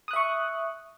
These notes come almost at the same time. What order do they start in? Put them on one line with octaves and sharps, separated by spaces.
D#6 F#6 E5 C#6